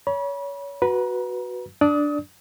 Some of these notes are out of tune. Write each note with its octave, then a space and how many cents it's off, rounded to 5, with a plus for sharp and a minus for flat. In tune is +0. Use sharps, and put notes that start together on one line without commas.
C#5 +25 B5 -35
F#4 +0 B4 -5 A#5 +30
D4 +0 D5 +0 D#6 +30